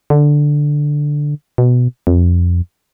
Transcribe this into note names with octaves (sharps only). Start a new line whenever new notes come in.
D3
B2
F2